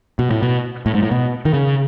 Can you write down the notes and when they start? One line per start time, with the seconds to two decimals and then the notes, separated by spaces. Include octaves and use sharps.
0.19 B2
0.30 A2
0.43 B2
0.86 A2
0.94 G#2
1.03 A2
1.11 B2
1.45 D#3
1.54 C#3